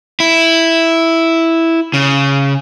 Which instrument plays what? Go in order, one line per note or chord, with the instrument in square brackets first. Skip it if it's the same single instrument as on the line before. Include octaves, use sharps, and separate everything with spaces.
[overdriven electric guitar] E4
C#3